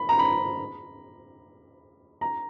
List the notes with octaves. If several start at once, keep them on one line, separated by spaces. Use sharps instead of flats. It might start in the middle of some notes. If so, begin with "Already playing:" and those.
Already playing: B5
A#5
B5
A#5